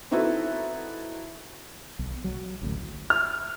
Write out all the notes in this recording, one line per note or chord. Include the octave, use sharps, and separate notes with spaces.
C4 D#4 E4 F#4 A4 B4
B1
F#3
A1 D2
F6